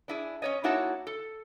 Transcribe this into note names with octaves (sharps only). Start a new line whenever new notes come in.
D4 E4 G#4
C#4 C#5 D#5
A#3 D#4 E4 F#4 C#5 A5
A4